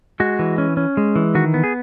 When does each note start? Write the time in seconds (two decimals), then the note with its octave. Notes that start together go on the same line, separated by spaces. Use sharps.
0.20 G#3 F#4
0.39 E3
0.58 C#4
0.77 C#4
0.97 G#3
1.16 E3
1.35 D#3 F#4
1.54 B3
1.64 G#4